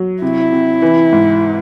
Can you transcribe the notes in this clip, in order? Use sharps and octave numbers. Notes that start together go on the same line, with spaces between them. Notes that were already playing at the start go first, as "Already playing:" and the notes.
Already playing: F#3
C3 E4
C3
E3
G#2